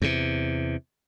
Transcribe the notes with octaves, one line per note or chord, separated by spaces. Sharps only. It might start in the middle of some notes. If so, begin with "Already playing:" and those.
E2 C3